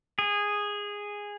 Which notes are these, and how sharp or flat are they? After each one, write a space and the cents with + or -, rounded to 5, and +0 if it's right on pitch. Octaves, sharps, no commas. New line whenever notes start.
G#4 -10